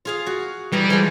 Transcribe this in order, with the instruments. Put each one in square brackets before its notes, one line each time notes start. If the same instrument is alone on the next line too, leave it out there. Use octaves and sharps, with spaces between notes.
[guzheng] F4 G#4 F5
F#4
[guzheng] E3 D#5 A#5 [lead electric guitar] G3
[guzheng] E3 F3 G#3